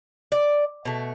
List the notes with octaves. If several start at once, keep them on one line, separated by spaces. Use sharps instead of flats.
D5
B2 A3